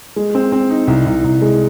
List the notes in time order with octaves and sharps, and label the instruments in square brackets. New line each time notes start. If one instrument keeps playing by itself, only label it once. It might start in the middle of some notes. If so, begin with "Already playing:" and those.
[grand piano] G#3
C4
C4
D#4
C2
C2
C2
G#3